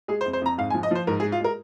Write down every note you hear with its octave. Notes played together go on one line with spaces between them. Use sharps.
G#3 G#4
C5
F2
C5
F2 A#5
G#2 F5
G#5
F3
D#5
F3 C5
G#2 A#4
G#4
G#3
F4
G#3 A#4